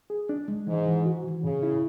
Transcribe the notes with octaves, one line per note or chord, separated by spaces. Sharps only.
G#4
D4
G#3
G#2 E3
E3
F#4
E3
A2 C#3
E4